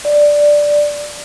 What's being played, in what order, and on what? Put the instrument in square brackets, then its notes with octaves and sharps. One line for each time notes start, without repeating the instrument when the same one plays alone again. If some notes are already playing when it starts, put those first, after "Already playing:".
[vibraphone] D5